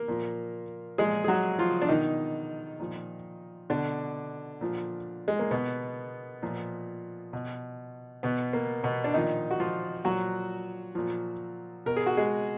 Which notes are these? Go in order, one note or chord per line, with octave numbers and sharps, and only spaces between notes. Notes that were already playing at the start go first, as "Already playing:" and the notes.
Already playing: A#3 A#4
A#2 F3
A#2 F3 G#3 G#4
G#4
F#3 F#4
F3 F4
D4
B2 D#3 D#4
A#2 F3
B2 D3 D4
A#2 F3
G#3
A#3
B2 B3
A#2 F3
B2
B2 B3
A#3
B2 B3
D4
A#2 D#3 F3 D#4
F#4
F3 F4
A#2 F3 F#3 F#4
A#2 F3
B2 A#4
G#4
F#4
G#3 G#4